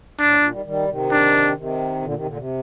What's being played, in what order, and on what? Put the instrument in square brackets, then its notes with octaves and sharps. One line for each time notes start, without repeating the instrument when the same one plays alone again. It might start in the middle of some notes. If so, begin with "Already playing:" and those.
[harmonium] A2 [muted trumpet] D4
[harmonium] A#2
D#3 G3
D#3 G3
C3 D#3
[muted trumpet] D4
[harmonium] C3 D#3
A#2 D3
C3 D#3
A#2 D3
C3